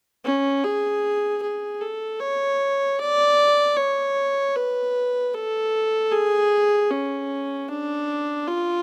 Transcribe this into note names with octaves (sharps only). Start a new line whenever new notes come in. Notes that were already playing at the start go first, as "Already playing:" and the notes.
C#4
G#4
G#4
A4
C#5
D5
C#5
B4
A4
G#4
C#4
D4
F4